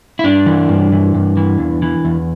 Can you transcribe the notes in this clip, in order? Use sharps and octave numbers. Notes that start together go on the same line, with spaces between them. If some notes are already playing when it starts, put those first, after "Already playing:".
E4
G2 D4
E3
G2
E3
G2
E3
E2
E3
E2